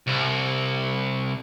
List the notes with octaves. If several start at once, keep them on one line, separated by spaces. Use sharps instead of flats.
C2